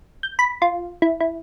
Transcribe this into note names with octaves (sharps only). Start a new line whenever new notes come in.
G6
B5
F4
E4
E4